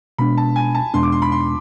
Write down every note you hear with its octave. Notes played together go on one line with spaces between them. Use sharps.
B2 G#3 B3 D4 B5
A5
G#5
A5
E2 B2 G#3 B3 D4 C6
D6
C6
B5
C6